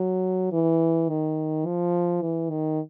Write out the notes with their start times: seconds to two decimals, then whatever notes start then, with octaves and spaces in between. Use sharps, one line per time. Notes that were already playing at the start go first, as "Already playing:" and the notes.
Already playing: F#3
0.52 E3
1.09 D#3
1.66 F3
2.22 E3
2.50 D#3